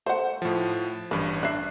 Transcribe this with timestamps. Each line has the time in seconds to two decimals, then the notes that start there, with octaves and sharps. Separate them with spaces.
0.06 A3 C5 F#5
0.42 A2 F3
1.11 A1 G2 B4
1.43 D4 E5 F#6 C7